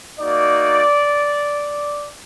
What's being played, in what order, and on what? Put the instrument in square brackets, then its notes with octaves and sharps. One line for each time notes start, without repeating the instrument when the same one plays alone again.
[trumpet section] A#3 D#4 F#4 D5